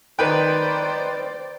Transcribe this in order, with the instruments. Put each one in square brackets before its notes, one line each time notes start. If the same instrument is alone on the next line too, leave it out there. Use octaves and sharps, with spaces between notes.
[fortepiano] D#3 B4 G5 [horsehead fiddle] C5 D5